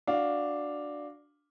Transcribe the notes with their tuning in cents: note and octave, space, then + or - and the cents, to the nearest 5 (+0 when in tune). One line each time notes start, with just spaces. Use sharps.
D4 +0 F#4 -5 F5 +0